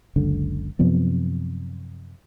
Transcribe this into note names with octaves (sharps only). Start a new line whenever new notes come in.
F#1 C#2 D3
F#2 C3 F3 B3